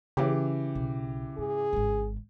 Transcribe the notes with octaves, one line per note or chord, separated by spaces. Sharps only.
C#3 E3 G4
B1
G#2 G#4
G#1 G#2